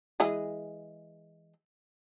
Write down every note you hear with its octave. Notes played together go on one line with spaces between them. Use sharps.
E3 G#3 G#4